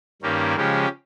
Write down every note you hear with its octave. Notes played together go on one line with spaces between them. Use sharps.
G2 D#3 A#3 C#4 G4
C#3 F3 G#3 C#4 G4